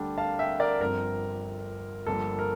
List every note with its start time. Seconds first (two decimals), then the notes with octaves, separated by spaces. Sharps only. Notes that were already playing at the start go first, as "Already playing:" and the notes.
Already playing: D2 D3 G3 D4
0.18 F5 A5
0.39 E5 G5
0.60 A#4 D5
0.80 G1 G2 F3 C4 A#4
2.06 G1 G2 F3 A#3 A4
2.39 A#4